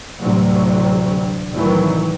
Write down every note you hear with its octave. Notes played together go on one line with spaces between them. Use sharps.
A1 D2 C3 F#3 G3
C2 A2 D#3 E3 F#3